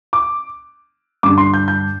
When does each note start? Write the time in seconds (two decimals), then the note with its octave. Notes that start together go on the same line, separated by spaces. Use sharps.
0.13 D6
1.23 G2 D3 G3 D4 D6
1.38 C6
1.54 G6
1.68 G6